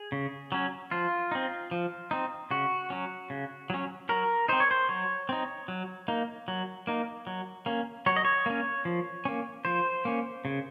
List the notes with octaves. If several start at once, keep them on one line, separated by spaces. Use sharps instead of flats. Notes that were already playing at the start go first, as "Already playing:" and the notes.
Already playing: G#4
C#3
F#3 C#4
F3 F4
C4 D#4
F3
C4 D#4
C#3 F#4
F#3 C#4
C#3
F#3 C#4
F#3 A#4
C4 D#4 C5
C#5
C5
F#3 C#5
C4 D#4
F#3
A#3 D#4
F#3
A#3 D#4
F#3
A#3 C#4
F#3 C#5
D#5
C#5
A#3 C#4
F3
A#3 C#4
F3 C5
A#3 C#4
C#3